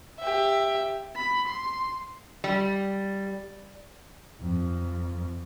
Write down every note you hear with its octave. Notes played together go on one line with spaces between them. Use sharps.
G4 E5
B5
C6
G3
F2